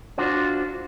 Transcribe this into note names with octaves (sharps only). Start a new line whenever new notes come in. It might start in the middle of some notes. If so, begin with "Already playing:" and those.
D4 F4 F#4 C5